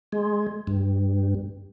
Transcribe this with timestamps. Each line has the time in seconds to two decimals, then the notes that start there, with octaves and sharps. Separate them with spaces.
0.12 G#3
0.67 G2